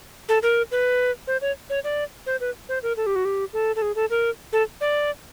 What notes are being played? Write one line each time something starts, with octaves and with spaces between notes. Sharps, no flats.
A4
A#4
B4
C5
C#5
C#5
D5
C5
B4
C5
A#4
A4
G4
F#4
G4
A4
A4
G#4
A4
A#4
A4
D5